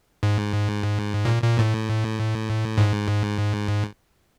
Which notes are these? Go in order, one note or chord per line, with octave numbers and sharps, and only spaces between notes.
G#2
A#2
A#2
A2
G#2